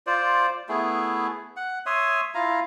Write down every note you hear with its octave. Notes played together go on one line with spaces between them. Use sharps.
F4 C5 D5
A3 B3 E4 G#4
F#5
C#5 E5 C6 D#6
E4 F4 F5 A#5